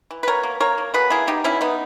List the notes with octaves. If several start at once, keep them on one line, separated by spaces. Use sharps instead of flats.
E3
B4
B2 A#4 C#5
A#3
A#3 A#4 C#5
A#3
B2 G#4 B4
A#3 E4 G#4
B2 D#4 G4
B2 C#4 E4
D#3 B3 D#4